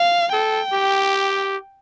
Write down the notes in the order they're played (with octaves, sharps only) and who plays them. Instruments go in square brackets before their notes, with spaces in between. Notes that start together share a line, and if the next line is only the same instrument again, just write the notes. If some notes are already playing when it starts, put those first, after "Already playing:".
Already playing: [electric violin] F5
[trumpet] A4 [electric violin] G5
[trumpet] G4